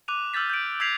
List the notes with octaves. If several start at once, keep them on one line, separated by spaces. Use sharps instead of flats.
D6 F#6 D#7 F7
D6 E6 F6 G6 A6 B6
G6 D7
E6 G6 G#6 B6 C7 F7